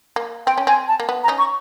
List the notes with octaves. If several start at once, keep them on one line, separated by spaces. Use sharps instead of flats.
A#3
C4 G5
C#4
C4 G#5
A5
A#3
B3
A#5
C#4 D#4
C#6